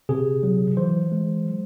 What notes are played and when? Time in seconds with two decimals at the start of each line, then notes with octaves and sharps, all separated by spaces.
0.09 C3 G#4
0.43 F#3
0.77 E3 C5
1.12 G#3
1.46 F#3